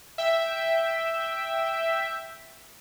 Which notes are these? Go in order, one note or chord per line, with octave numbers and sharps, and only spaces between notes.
E5 G5